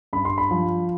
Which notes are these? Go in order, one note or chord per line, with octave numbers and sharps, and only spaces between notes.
G2 B5
C6
B5
F3